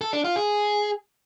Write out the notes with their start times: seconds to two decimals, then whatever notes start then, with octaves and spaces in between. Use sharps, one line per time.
0.01 A4
0.13 D4
0.24 F4
0.36 G#4